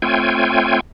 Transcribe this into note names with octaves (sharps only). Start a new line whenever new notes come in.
A3 C4 F4 C#5 G5 G#5